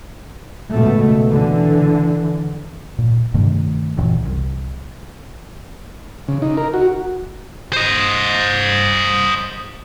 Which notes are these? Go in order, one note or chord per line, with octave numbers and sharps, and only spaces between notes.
C#2 B2 A3
D3 E3
A#2
G2 C3 D#3 A3
F#1 C#2 A#2 E3
C2
C#3
D#4
A#4
F#4
C5 D#5